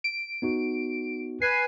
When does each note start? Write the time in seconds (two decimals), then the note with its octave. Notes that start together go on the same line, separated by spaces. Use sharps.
0.04 D7
0.42 B3 D#4 F#4
1.42 B4 G#5 C7